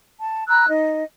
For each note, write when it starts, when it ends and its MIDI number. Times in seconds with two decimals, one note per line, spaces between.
0.19 0.44 81
0.48 0.67 82
0.48 0.67 83
0.48 0.67 88
0.48 0.67 90
0.67 1.03 63
0.67 1.03 75